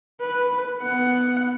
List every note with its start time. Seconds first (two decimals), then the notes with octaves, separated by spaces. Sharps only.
0.21 B4
0.80 B3 F#5